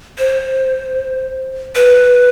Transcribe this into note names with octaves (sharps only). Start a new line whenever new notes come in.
C5
B4